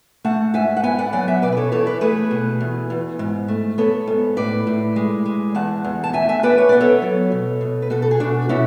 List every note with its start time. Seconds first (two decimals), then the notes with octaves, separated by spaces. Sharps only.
0.24 A3 F#5 A5
0.54 G#2 E5 G#5
0.77 F#5
0.84 B3 E5 G#5
0.98 D5 F#5
1.13 F#3 D5 F#5
1.28 E5 G#5
1.42 B2 B4 D5
1.52 B4
1.57 A4 C#5
1.72 E2 A4 C#5
1.87 B4 D5
2.01 A3 G#4 B4
2.31 B2
2.61 E2
2.90 E2
3.19 G#2
3.48 A3
3.78 B3 A4 C#5
4.07 G#2
4.37 A2 B4 D5
4.67 A2
4.96 G#3
5.25 G#3
5.55 E2 F#5 A5
5.84 E2
6.04 A5
6.13 D2 E5 G#5
6.28 E5 G#5
6.43 B3 B4 D5
6.58 C#5
6.69 B3 D5
6.81 A4 C#5
7.02 F#3
7.32 B2
7.61 B2
7.82 B4
7.90 B2 F#4 A4
8.02 A4
8.11 G#4
8.20 B2 D4 F#4
8.49 B2 C#4 E4